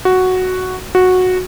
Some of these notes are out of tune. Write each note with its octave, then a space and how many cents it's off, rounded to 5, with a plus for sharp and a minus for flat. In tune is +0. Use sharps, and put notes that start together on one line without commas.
F#4 +0
F#4 -10